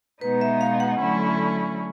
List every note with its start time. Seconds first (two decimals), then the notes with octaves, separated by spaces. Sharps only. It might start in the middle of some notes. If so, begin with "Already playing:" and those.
0.21 B2 G#3 B3 D#4 B4
0.41 E5
0.61 F5
0.80 F#5
1.00 D3 F#3 A3 C#4 E4